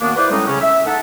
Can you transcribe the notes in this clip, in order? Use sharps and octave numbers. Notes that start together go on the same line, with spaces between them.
F#2 D#3 A#3 B3 D4 F#4
E4 G#4 B4 C5 D5
A2 G3 G#3 C#4 D#4
C#3 C#4
E5
A3 D#4 E5 F#5 A5